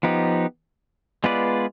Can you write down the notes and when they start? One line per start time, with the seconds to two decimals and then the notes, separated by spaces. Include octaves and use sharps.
0.03 F3 B3 D#4 G4
1.24 G#3 B3 F4 B4 D5